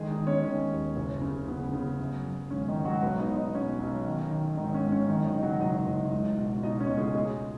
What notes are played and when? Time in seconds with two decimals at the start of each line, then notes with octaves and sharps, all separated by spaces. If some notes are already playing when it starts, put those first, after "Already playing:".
Already playing: D#3 G#3 G#4
0.11 D#4 D#5
0.19 D#3
0.27 C#4 C#5
0.44 D#3 C#4
0.71 D#2
0.96 F#1
1.22 C#3
1.48 C#3 B3
1.73 C#3
1.99 F#2
2.25 F#2
2.51 G#1 C#4
2.68 D#3 D#4
2.77 G#1
2.85 F#3 F#4
3.02 B1 B3 B4
3.19 D#4 D#5
3.28 B1
3.36 D#4 D#5
3.54 B2 C#4
3.80 B1
4.06 D#3
4.31 D#3
4.57 G#2 D#3 D#4
4.74 C#4
4.83 G#1
4.92 C#4
5.08 F#2 D#3 D#4
5.26 D#3 D#4
5.34 C#3
5.43 F#3 F#4
5.61 F#1 D#4 D#5
5.86 F#1
6.13 C#2
6.38 B2
6.63 B2 D#4 D#5
6.80 C#4 C#5
6.89 C#2
6.98 G#3 G#4
7.15 B2 G#3 G#4